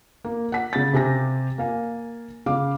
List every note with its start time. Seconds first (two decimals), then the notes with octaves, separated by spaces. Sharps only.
0.24 A#3
0.52 F#5 B6
0.73 C#3 A6
0.93 C3 G4 G#5 A#6
1.58 A#3 F5 G#5
2.46 C#3 F5 D6